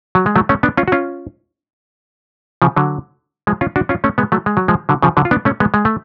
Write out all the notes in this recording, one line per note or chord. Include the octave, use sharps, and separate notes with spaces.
F#3
G#3
F#3 A3
A3 C#4
B3 D4
C#4 F4
F#4
C#4 F4
C#3 F3
D3 F#3
F3 G#3
C#4 F4
D4 F#4
C#4 F4
A3 C#4
G#3 B3
F#3 A3
G#3
F#3
F3 G#3
D3 F#3
C#3 F3
D3 F#3
F4
B3 D4
A3 C#4
G#3 B3
G#3
A3